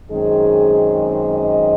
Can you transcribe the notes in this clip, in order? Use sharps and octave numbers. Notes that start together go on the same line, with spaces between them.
F#2 D#3 G#3 C4 G#4
D#5